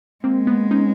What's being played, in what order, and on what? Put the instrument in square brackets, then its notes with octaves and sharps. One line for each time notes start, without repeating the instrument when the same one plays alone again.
[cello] G#3 [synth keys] A#3 C4
[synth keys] B3
C#4 D#4